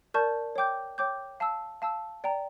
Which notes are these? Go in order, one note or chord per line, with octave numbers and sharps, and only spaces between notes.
A#4 D5 A5 C#6 G6
C#5 G5 D6 G6
C#5 G5 D6 G6
F5 A5 E6
F5 A5 E6
D5 G5 A#5